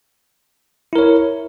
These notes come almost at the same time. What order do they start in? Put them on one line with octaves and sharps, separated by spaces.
E4 A#4 C#5